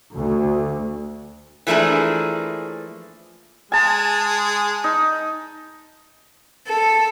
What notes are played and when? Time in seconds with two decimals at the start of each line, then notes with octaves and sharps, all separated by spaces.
0.16 D2
1.67 E3 F3 A3 A#3 D4 G#4
3.72 G#3 G#5 A5
4.84 D#4
6.66 A4